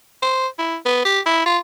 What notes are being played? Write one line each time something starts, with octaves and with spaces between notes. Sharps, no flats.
C5
E4
B3
G4
E4
F4